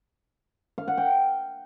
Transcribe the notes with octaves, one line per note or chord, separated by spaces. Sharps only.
F5
F#5
G5